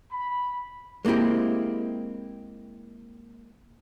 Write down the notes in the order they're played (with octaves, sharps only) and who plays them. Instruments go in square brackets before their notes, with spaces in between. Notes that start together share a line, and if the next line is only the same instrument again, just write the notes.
[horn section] B5
[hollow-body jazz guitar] G#3 A#3 C4 E4 G4